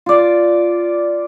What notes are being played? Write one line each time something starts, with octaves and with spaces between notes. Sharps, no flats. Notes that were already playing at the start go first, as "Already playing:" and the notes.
F4 D5